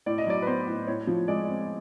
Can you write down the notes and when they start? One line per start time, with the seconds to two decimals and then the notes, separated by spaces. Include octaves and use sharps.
0.06 A2 D5
0.18 D#5
0.27 F#3 D5
0.42 B4
0.47 B3 C5
0.67 A2
0.87 A2 C#5
1.07 F3
1.28 G#3 D5
1.49 C4